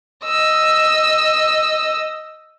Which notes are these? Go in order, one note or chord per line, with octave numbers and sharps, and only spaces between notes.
D#5 E6